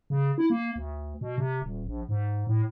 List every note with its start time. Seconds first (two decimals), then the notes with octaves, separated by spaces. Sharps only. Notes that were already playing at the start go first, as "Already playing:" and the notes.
0.10 C#3
0.38 E4
0.50 A#3
0.76 D2
1.21 B2
1.38 C3
1.62 D#1
1.87 A#1
2.09 G#2
2.47 A2